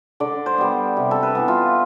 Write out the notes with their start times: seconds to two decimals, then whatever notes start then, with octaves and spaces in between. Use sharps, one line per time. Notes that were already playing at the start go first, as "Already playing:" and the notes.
0.20 D3 D5
0.46 C5
0.58 G3 B3
0.97 C3
1.11 A4
1.23 B4
1.35 E3 B3
1.48 F4